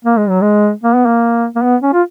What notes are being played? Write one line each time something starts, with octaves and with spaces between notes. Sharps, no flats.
A#3
G#3
F#3
G#3
A#3
B3
A#3
A#3
B3
C#4
F4